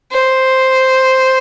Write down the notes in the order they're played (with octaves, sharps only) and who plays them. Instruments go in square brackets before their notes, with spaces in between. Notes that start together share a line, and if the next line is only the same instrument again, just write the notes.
[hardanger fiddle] C5